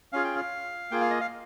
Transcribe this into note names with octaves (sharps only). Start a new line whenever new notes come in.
C#4 F4 G#4 F5
G5
F5
A#3 F4 G#4 G5
F5
D#5
F5